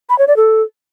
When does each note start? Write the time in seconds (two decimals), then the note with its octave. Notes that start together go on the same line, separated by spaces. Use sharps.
0.10 B5
0.19 C#5
0.28 D5
0.37 A4